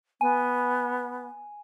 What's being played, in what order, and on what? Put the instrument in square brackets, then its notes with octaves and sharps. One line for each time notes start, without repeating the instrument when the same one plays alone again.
[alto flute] B3 [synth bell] G#5